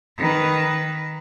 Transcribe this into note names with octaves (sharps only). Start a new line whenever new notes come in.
D#3 B4